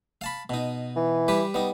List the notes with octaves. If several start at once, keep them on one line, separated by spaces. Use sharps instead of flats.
F5 A5 B5
B2 D#4
E3
G3 G4 B4
G3 B3 D#4